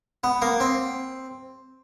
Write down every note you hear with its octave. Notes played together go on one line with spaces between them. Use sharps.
B3
A#3
C4